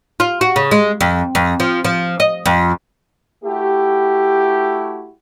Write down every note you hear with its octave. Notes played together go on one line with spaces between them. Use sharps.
F4
F#4
C#3
G#3
F2
F2
F3
F3
D#5
F2
A3 E4 F#4 G4